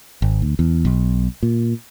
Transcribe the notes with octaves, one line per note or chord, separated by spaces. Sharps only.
G#1
D2
E2
B1
A#2